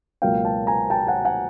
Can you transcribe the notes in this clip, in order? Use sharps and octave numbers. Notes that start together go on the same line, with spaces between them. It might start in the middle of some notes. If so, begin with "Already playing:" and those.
C#2 B2 F#3 A#3 F5 G5
G5 A5
G#5 A#5
G5 A5
F#5 G#5
F#5 G#5